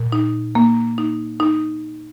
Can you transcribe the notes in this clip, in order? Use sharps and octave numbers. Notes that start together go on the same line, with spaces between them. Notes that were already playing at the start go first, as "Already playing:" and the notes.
Already playing: A#2
D#4
A#3
D#4
D#4